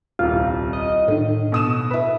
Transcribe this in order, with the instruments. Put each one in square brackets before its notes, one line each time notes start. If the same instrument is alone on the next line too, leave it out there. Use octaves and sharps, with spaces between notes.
[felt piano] D#1 C2 [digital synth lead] F4
[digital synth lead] D#5
[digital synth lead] A2 [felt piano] D3 D#3
[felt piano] B2 D#6 E7
E4 B4